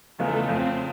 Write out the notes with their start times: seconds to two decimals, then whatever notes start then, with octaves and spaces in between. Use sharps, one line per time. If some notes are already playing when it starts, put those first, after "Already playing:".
0.18 E2 C#3 F3 G#3 A3 B3
0.48 F2 C#3 F3 C4